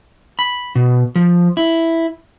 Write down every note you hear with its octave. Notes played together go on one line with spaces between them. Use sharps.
B5
B2
F3
E4